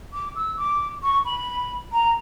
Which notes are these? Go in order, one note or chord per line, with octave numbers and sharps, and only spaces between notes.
D6
E6
D6
C#6
B5
A#5